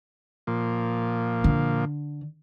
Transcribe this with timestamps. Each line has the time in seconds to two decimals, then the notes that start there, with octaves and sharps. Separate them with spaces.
0.47 A#2 F3
1.44 D3